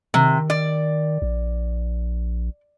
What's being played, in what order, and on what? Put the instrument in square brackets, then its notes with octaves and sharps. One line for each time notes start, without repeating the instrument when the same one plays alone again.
[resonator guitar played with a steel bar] C3 [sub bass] D#3
[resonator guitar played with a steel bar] D5
[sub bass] A#1